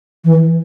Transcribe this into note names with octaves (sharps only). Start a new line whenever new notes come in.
E3